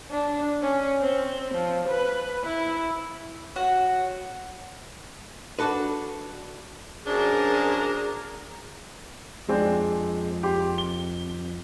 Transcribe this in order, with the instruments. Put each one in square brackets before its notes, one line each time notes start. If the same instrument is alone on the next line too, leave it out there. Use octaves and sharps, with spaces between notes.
[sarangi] D4
C#4
C4
F3
B4
E4
[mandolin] F#4 C#5
[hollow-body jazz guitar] D4 F#4 A4 B4
[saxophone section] F#2 C4 D4 [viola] G#4 A#4
[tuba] F2 [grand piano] G#3 C4 D4
[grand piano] G4 C6
G7